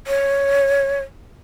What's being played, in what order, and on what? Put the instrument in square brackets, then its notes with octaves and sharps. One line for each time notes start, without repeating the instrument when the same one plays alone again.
[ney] C#5